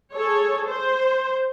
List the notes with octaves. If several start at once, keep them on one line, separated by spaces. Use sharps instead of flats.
G#4 A4 C#5
C5